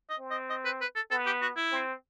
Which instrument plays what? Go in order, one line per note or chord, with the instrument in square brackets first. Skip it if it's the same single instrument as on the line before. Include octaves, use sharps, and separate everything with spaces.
[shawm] D#5
[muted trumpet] C4
[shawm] D#5
D#5
B4
B4
A4
[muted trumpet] B3 [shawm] A4
[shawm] G4
F#4
E4
[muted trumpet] C4